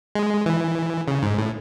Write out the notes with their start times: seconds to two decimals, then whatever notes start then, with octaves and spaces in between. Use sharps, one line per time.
0.15 G#3
0.46 E3
1.08 C#3
1.23 G#2
1.38 A2